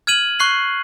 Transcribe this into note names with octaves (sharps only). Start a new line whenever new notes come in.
F6 G#6 D#7 F#7
C#6 F#6 C7 F#7